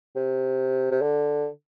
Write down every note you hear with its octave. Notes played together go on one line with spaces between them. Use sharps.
C3
C3
D3